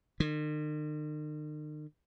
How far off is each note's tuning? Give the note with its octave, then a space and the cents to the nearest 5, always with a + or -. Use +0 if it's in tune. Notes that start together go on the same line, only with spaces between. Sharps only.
D#3 -45